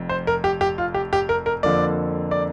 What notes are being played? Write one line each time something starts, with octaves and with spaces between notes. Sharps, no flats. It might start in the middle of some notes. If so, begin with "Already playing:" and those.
Already playing: F1 F2 F3
C5
A#4
G4
G4
F4
G4
G4
A#4
A#4
F2 D3 F3 A#3 D5
D5